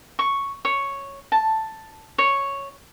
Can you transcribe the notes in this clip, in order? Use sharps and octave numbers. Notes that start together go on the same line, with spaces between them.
C#6
C#5
A5
C#5